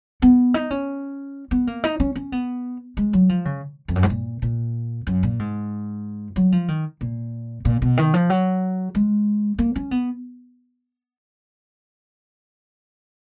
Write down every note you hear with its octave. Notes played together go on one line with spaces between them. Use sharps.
B3
D#4
C#4
B3
A#3
D#4
C#4
C#4
B3
G#3
F#3
F3
C#3
F2
F#2
G#2
A#2
A#2
F#2
A#2
G#2
F#3
F3
D#3
A#2
A#2
B2
D#3
F3
F#3
G#3
A#3
C#4
B3